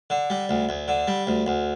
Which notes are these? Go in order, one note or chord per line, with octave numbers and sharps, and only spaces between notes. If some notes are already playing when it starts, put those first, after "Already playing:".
D3
G3
D2
D2
D3
G3
D2
D2